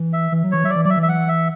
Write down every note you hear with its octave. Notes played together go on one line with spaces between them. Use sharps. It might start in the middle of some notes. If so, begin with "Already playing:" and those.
Already playing: E3
E5
E3
F#3
E3 C#5
F#3 E5
D5
E3
F#3 D5 E5
E3
E5
F#5
E5